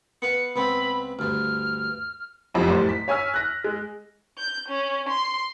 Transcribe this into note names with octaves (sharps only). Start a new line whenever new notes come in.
B3 B4 F5 C#7
C#2 B3 C4 B5
D2 G2 F6
B1 F2 C3
F#1 A2 G3 C5 D5
B6
C#5 G#5 E6 F6 B6
F#6 A#6
G#3
G6
C#4
C6